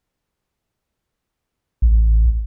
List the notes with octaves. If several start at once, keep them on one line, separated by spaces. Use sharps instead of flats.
A1